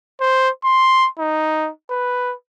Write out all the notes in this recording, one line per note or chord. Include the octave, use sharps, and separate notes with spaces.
C5
C6
D#4
B4